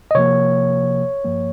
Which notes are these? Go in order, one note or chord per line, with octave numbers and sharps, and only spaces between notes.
D#5
C3 F3 A#3 C#5
G2 F3 A#3